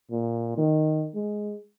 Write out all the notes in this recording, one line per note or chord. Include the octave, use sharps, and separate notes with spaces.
A#2
D#3
G#3